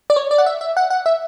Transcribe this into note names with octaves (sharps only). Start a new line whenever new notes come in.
D5
C#5
D5
F#5
E5
E5
F#5
F#5
E5